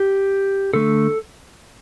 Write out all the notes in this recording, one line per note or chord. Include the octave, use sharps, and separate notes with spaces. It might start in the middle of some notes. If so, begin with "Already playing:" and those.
Already playing: G4
D3 A3 A4